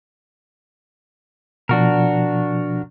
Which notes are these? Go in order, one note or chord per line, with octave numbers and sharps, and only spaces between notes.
B2 F3 D4 F#4 A#4